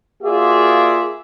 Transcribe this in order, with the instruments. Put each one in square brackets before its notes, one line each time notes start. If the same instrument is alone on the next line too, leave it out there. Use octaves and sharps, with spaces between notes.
[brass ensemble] A#3 F4 F#4 G#4 D5 E5